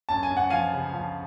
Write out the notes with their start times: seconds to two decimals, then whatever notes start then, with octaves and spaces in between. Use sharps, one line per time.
0.09 F#2 A5
0.23 G#5
0.30 F#2
0.37 F#5
0.50 F3 F5 G#5
0.73 C#3
0.94 F3